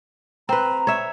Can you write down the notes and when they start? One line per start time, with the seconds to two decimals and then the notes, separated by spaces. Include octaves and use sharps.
0.49 C4 B4 A#5
0.87 C#5 E5